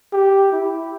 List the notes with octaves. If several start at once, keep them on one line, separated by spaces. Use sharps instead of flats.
G4
E4